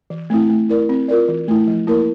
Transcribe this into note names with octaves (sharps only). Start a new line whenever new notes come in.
E3
A3 C4 E4
A3
E4 A#4 D5
C4
F4 A#4 D5
E3
A3 E4
F3
A#3 E4 A#4